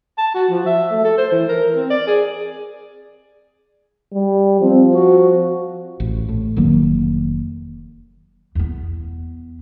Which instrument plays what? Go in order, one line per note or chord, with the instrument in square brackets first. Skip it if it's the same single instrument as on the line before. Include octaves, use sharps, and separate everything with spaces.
[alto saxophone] A5
F#4
F3
E5
A3
A4
C5
E3
A#4
C4
D5
G#4
[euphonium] G3
[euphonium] F3 [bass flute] C4
[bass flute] F#4
[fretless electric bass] A1
A2
F1 D#3 F#3 A#3
[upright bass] E2 B3